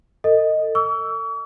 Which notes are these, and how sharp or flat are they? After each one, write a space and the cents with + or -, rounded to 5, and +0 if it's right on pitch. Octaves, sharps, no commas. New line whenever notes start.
A4 +40 D#5 +0
C#6 +45 E6 +5